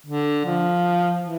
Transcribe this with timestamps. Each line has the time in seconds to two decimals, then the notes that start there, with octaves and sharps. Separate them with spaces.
0.07 D3
0.45 F3
1.22 E3